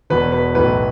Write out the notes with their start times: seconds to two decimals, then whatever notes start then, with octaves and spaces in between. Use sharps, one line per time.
0.10 E1 E2 B2 B4
0.32 B4
0.55 B1 A2 E3 B4